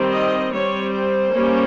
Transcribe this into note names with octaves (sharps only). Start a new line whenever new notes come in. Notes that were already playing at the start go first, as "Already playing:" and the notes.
Already playing: D#3 G3 C4
D#5
G3 C4 C#5
C5
G3 A#3 C#4